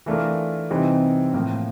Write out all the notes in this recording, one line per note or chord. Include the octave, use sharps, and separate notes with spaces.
E3 A3 D4 F4 A#4
C3 E3 G3 C4 D#4
A2 F3 A#3